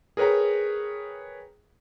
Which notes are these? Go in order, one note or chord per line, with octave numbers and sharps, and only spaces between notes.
G#4 A#4 B4 C#5 G5 A#5